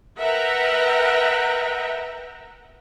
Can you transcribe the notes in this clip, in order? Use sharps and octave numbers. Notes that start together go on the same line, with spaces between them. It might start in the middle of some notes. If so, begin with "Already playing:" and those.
A#4 B4 E5 F#5 G5 A#5